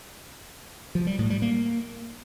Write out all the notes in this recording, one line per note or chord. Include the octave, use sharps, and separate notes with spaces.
F3
G3
A2
G3
A#3